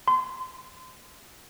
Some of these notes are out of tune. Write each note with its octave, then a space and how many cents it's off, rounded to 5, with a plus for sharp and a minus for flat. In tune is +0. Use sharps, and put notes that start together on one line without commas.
C6 -30